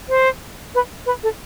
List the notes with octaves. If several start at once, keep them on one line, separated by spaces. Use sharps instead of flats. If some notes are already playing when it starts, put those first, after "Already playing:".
C5
B4
B4
A4